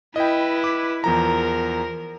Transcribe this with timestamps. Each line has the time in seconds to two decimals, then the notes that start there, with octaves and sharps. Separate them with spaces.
0.16 E4 B4 D#5 G5
0.64 D6
1.04 E2 F3 A#4 A#5